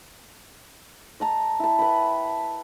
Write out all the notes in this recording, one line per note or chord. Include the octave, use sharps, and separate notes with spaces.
D#5 A5 A#5
E4 A5
B4 G5 B5